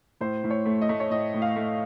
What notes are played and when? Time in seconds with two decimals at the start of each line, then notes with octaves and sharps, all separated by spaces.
0.21 A2 C5
0.44 A2
0.50 C#5
0.66 A3
0.82 D#5
0.89 A3
1.00 C#5
1.11 A2 D#5
1.34 A2
1.42 F5
1.56 A3